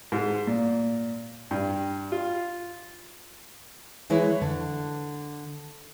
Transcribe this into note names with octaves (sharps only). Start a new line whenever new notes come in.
G#2
A#2
G2
F4
E3 G#3 E4 B4 C#5
D3